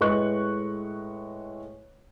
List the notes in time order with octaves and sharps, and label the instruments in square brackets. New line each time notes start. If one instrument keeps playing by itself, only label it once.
[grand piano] A2 G#3 B4 D#5 C#6 F#6